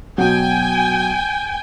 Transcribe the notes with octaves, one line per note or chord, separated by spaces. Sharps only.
B2 F#3 G5 G#5